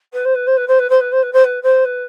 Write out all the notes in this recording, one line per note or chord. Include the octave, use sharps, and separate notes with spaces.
B4
C5
B4
C5
B4
C5
B4
C5
B4
C5
B4
C5
B4
C5
B4